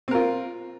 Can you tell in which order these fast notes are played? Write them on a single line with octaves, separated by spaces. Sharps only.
C4 A#4 F4